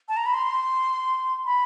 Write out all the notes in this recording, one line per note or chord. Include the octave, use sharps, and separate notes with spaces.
A5
A#5
B5
C6
B5